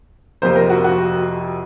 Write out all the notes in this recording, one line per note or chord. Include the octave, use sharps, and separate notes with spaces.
F2 C3 F3 A#3 C5
A#4
F#4
F#4